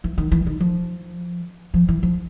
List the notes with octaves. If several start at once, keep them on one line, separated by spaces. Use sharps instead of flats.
E3
D#3
E3
D#3
F3
F3
E3
F3